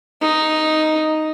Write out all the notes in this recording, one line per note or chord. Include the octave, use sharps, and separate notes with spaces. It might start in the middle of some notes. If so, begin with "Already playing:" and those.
D#4